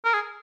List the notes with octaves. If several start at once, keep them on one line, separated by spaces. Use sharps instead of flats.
A#4
G#4